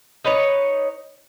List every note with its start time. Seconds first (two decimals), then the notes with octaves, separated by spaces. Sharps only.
0.25 D#4 B4 C#5